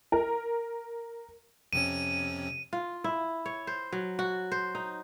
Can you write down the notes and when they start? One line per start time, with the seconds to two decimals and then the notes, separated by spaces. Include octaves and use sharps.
0.12 A#4
1.73 F2 C3 C#4 D#7
2.73 F4
3.04 E4
3.46 C#5
3.67 C5
3.92 F#3
4.19 F#4
4.52 C5
4.75 D#4